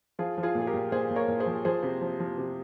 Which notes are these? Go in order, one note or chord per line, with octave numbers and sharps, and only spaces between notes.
F3 F4 G#4
F3
F4 G#4
A#2
G#4
G4 A#4
A#2
A#2 G#4 C5
A#2
A#4 C#5
A#2
G#4 C5
F3
F3 G#4 C5
C3
F3
F3
C3